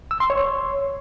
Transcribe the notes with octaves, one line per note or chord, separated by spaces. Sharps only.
E6
C6
C#5